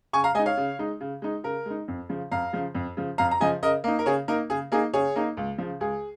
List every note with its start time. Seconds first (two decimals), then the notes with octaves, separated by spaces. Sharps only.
0.13 C#3 G#5 C#6
0.24 F5 A#5
0.34 G#3 D#5 G#5
0.39 D#4
0.46 C#5 F5
0.57 C#3
0.79 G#3 D#4
1.01 C#3
1.22 G#3 D#4
1.44 C#3 A#4
1.66 G#3 D#4
1.88 F2
2.09 C#3 F3
2.31 F2 F5 A#5
2.53 C#3 F3
2.75 F2
2.97 C#3 F3
3.18 F2 F5 A#5
3.31 A#5
3.40 C#3 F3 D#5 G#5
3.62 C#3 A#4 D#5
3.84 A#3 D#4
3.99 A#4
4.06 C#3 G#4 C#5
4.28 A#3 D#4 A#4
4.50 C#3 G#4
4.72 A#3 D#4 G#4
4.94 C#3 G#4 C#5
5.16 A#3 D#4
5.37 C#2
5.58 C#3 F3
5.80 C#2 G#4